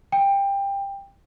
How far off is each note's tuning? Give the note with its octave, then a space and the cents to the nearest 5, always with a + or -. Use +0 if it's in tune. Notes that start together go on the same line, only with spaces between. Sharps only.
G5 +20